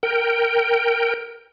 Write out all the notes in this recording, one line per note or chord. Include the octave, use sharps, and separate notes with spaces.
A#4 G5